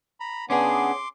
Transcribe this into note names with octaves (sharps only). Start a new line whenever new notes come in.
A#5 B5
B3 C#4 D4 G#4 C6 D6